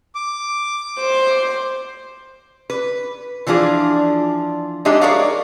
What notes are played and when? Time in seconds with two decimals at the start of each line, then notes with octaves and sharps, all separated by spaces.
0.15 D6
1.00 C5
2.70 B4
3.47 E3 F3 D4 F4 G#4
4.85 G#3 D4 D#4 G4 D#5 E5
5.01 G4 G#4 A#4 C#5 D5 F5